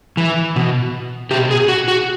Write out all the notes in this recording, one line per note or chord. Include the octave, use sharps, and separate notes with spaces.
E3
B2
B2 G4
G#4
F#4
F#4